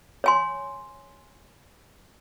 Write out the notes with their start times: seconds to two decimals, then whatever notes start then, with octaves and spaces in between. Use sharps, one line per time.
0.24 C#5 G#5 C6